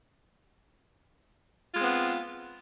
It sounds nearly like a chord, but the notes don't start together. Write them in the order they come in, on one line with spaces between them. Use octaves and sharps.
F4 G#3 C4 B3